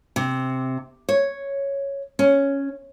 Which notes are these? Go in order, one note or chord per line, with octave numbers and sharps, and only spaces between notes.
C3
C#5
C#4